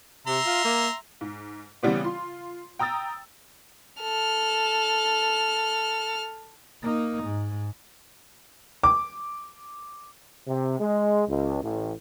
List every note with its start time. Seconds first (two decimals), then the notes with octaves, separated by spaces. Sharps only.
0.27 C3 E5 A#5 C6
0.46 F4
0.65 A#3
1.21 G#2
1.83 C#3 E3 G3 B3 C4
2.04 F4 C6
2.79 G5 A#5 D#6 E6 A6
4.01 A4 F6
6.83 A#3 D#4
7.23 G#2
8.83 D6
10.47 C3
10.79 G#3
11.28 C#2
11.62 A1